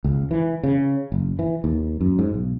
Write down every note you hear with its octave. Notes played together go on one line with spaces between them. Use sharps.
C#2
E3
C#3
F#1
E3
D#2
F#2
G#2
B1